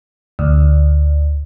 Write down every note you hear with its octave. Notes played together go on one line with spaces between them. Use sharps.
D2